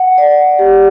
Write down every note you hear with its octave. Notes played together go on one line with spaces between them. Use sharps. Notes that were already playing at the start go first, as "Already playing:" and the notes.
Already playing: F#5
D5
G4